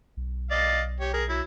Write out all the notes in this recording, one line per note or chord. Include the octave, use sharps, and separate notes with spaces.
B1
D5 D#5 F5
G4 C#5
G#4 A#4
F#3 E4